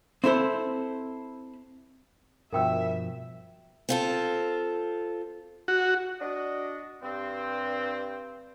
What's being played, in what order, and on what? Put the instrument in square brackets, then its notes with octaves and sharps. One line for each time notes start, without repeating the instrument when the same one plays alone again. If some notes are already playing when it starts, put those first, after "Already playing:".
[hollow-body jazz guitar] C4 E4 A4 C5
[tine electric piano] G2 B2 F3 [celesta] A#4 G5 E6 [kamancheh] E5
[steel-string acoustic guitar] C4 F4 A4
[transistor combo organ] F#4
[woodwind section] D4 F#4 D#5
G2 C4